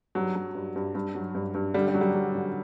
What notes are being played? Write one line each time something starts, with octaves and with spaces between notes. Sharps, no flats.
G2 F#3
F#3
G2
G2
G2
F#3
G2
G2
D3 G3
G3
F#3
G3
F#3
D3